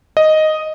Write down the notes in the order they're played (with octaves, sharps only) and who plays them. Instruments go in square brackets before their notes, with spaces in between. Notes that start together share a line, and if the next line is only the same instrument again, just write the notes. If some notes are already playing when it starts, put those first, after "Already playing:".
[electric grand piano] D#5